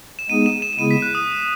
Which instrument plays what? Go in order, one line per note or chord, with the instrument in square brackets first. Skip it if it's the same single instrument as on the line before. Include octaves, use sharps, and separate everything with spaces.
[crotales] E7
[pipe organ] G#3 B3 D#4 G#4 [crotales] D#7
[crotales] E7
E7
E7
[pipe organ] C#3 G#3 B3 E4 G#4 [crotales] D#7
[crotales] B6
F#6
D#6